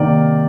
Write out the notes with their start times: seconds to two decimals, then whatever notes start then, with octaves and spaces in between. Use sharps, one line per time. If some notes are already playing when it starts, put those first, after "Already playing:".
Already playing: C3 D#3 A#3 D5